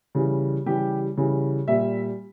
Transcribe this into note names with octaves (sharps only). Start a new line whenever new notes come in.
C#3 E3 G3
C#3 E3 G3 G4
C#3 E3 G3
A#2 G3 E5